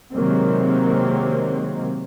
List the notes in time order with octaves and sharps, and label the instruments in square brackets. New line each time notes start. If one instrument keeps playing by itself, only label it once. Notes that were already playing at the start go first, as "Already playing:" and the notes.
[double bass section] C3 D#3 F#3 G#3 A#3 C4